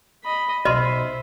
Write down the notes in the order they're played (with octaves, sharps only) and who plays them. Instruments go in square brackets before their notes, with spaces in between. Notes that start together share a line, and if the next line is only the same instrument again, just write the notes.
[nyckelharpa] D#5 B5
[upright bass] B1 [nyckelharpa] C5 E5 [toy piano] D#5 C6 [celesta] B5 F6 D#7